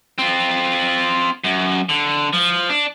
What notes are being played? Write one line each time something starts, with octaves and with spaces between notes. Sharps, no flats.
C4 F4
F#2
D3
F3
D4